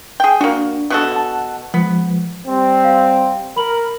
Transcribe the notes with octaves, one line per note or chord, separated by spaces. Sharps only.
G#4 G5
A#3 D4 F#4
B2 F#4 A4
F#5 A5
F3 G#3 B3
G3 C4
F5
A#4 B5 F#7